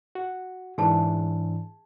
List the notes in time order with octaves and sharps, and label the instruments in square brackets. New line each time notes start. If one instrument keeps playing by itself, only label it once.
[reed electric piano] F#4
[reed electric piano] G#2 E3 D4 [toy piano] G#4 A5